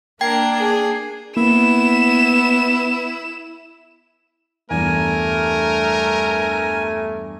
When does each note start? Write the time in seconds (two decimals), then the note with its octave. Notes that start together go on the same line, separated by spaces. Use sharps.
0.21 A#3 D4 A#4 G5 G#6 C7
0.57 G#4
1.37 A#3 B3 E4 E7
4.70 E2 G2 A3 A#4 G#5